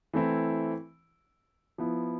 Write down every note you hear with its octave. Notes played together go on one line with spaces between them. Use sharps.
E3 A3 C4 E4
F3 B3 E4